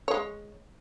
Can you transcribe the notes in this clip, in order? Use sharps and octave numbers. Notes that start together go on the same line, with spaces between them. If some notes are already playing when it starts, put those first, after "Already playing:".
G#3 C#5